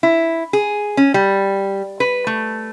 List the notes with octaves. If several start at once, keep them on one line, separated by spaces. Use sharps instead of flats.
E4
G#4
C#4
G3
B4
A3